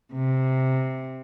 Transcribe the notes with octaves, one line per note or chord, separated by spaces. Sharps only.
C3